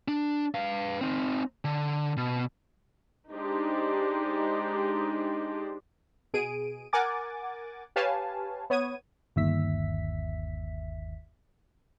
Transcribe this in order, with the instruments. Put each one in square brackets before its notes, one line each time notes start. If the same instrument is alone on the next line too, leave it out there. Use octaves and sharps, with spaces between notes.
[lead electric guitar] D4
B4 F5
C4 D#4
D3
B2
[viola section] G#3 D4 D#4 G4 C5 D5
[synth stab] B2 G#4 D7 D#7
A#4 F#5 G#5 D6 A6
G4 B4 C#5 F5 G#5 A5
B3 C#5 D#6 G#6 D#7
[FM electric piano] G1 D#2 E5 B6